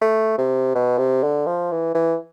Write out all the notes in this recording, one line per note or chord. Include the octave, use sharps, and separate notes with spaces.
A3
C3
B2
C3
D3
F3
E3
E3